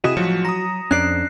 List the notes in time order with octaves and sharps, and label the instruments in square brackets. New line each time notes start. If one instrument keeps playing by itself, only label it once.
[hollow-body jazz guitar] C3 F#4 D#5 [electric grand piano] E4 G#4 D#6 [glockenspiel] B6 E7
[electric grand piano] A1 F3 C#7 [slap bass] F#3 [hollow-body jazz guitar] F#4
[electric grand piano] A#5 D#6 [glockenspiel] A#6
[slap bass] F2 [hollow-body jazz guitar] C#4 D4 D5 [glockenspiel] F#6 C7